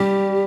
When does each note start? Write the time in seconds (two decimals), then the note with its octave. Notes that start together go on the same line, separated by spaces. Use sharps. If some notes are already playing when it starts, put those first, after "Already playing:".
Already playing: G3 G4